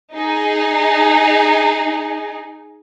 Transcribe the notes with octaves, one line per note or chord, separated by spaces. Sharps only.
D#4 G#4